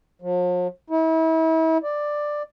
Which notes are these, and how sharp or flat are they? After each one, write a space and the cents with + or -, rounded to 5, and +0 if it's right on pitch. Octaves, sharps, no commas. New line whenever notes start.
F3 +45
E4 -35
D5 +10